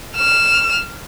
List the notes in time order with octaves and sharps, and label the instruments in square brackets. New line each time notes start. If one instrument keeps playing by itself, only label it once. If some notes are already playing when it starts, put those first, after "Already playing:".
[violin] F6 E7